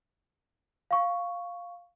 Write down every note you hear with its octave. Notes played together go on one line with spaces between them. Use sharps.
F5 C#6